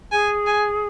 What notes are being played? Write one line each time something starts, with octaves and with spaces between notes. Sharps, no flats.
G#4 G#5
G#5